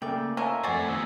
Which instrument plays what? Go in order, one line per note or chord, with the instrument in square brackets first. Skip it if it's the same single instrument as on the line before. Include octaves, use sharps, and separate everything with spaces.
[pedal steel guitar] C#3 A3 D5 [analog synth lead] A#3 [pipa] G5
[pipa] F3 C#4 A#4 [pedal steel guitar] D#5 E5 G#5
[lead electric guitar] F2 C5 [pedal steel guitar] A3 [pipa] F#4 D5 G#5
[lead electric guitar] D#3 B3 [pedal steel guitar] G#4 D#5 [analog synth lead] E6